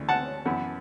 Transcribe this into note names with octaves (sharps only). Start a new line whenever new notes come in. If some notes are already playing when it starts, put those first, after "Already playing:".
Already playing: D2 C#3 E3
F#5 A5
F#2 E3 B3